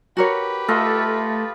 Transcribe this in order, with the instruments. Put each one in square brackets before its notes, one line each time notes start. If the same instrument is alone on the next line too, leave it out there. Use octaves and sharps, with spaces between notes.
[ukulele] F#4 A#4 C#5 [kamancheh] G4 B4
[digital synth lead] A3 [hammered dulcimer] F4 A4 D#5